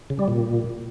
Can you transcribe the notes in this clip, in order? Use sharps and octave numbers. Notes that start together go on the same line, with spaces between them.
C#3
G3
A#2